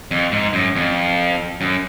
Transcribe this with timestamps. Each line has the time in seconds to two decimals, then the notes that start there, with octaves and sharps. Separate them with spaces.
0.11 F2
0.32 G#2
0.53 F#2
0.76 F2
1.61 F#2